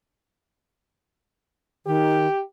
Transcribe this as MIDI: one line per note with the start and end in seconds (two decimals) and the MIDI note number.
1.86 2.27 51
1.86 2.41 67